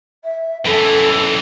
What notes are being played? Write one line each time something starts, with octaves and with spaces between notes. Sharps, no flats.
E5
F#2 E3 A4